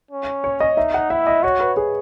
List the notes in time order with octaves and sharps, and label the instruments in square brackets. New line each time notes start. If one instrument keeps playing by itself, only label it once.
[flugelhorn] C#4
[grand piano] C#5
D#5
[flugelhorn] D#4 [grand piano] E5
[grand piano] F#5
[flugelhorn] E4 [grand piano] E5
[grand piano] D#5
[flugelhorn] F#4 [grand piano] C#5
[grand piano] B4
G#4